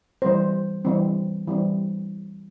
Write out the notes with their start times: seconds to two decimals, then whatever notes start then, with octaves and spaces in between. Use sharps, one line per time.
0.22 E3 G3 C4 C5
0.85 E3 G3 C4
1.47 E3 G3 C4